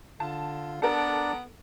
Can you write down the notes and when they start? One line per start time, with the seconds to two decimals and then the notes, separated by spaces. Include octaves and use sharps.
0.20 D3 F4 A5
0.82 B3 D4 A4 A#4 D5